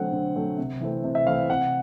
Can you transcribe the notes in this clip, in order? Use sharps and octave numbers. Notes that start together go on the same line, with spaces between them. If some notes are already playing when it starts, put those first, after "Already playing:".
Already playing: D3 F#3 A3 C4 F#5
D3
F#3 A3 C4
C3
E3 A3 C4
C3
E5
E3 A3 C4 F5
C3 F#5